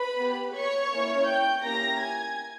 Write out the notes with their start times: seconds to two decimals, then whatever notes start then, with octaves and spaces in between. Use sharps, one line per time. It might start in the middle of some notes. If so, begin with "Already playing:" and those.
Already playing: B4 B5
0.17 B3
0.22 G4
0.54 C#5 C#6
0.91 A#3 C#4 E4
1.28 G5 G6
1.64 A#3 C#4 E4 G4 A#5 A#6
2.01 G#5 G#6